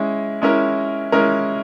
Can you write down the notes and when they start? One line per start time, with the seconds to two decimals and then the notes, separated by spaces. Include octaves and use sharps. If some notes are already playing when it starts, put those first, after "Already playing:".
Already playing: G#3 C#4 E4
0.42 G#3 C#4 E4 A#4
1.12 G#3 C#4 E4 A#4